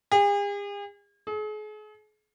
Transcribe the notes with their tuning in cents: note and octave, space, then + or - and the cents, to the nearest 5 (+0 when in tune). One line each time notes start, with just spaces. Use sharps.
G#4 -45
G#4 +40